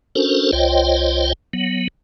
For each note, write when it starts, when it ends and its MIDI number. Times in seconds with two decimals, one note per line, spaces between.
0.15 0.51 61
0.15 0.51 62
0.15 0.51 66
0.15 0.51 69
0.15 0.51 70
0.15 0.51 72
0.52 1.33 36
0.52 1.33 65
0.52 1.33 72
0.52 1.33 73
0.52 1.33 75
0.52 1.33 79
1.53 1.88 54
1.53 1.88 59